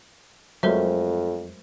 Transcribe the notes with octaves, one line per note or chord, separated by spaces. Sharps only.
F2 F#3 G#3 A3 A#4 C5 E5